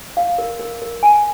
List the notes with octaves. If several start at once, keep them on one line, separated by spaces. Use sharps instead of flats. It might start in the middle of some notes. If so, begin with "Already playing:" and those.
F5
A#4
A#4
A#4
G#5